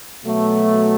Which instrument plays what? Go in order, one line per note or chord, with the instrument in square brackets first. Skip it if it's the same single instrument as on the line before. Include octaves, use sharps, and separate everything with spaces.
[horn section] B2 F#3 A3